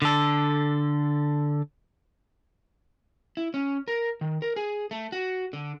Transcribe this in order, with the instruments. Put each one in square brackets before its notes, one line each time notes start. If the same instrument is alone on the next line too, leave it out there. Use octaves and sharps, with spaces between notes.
[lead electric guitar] D3 A4
[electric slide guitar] E4
C#4
A#4
D#3
A#4
G#4
A3
F#4
D3